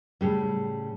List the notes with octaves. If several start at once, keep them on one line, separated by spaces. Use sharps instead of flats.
A2 C#3 G3